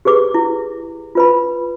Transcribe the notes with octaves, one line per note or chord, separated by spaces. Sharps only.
G4 G#4 B4 D6
E4
F4 B4 B5